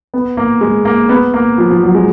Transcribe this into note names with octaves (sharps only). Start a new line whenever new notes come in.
B3
A#3
G#3
A#3
B3
A#3
F3
F3
F#3
G#3